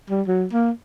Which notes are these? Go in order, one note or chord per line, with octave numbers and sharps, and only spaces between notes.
G3
F#3
A#3